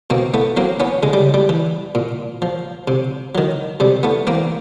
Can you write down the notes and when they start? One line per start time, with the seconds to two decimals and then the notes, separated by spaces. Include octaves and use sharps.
0.10 B2 A#3 C4
0.34 A3 B3
0.57 F#3 A#3 C4
0.80 B3 C#4
1.03 C#3 G#3
1.13 G3
1.34 G3
1.49 E3
1.95 A#2
2.42 F3
2.88 C3
3.35 D#3 F#3
3.80 C3 G3
4.03 A3 B3
4.27 E3 A#3 C4